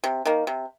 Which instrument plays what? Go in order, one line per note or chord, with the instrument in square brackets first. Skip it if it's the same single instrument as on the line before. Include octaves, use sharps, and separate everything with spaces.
[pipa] C3
D#3 A#3
C3